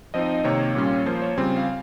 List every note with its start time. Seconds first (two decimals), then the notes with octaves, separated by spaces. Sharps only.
0.14 F3 C4 D#4 D#5
0.44 C3 D#3 A#3 C#5
0.75 A#2 G3 C#4 F4
1.06 F3 A#3 F4 C5
1.22 C#5
1.38 C#3 G3 C4 F4 G#5
1.57 F5